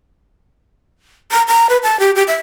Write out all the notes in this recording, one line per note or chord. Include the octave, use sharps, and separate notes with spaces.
A#5
A#5
B4
A5
G4
G4
E5